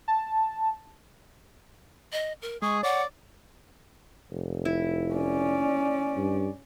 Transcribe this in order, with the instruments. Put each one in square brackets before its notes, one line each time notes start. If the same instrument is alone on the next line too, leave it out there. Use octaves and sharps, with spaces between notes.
[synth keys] A5
[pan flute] D#5
A#4
[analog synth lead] G#3 [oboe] G#4 [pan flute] C#6
[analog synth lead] C#5 [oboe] D5 [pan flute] F#5
[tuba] F1
[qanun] E4
[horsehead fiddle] C#4 D5
[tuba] G2